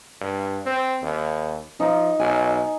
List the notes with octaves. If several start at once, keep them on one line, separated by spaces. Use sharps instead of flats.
G2
C4
D#2
F3 D#4
B1 G#5